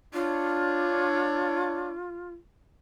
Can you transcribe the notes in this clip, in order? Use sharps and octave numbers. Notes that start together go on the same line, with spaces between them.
D4 F4 C#5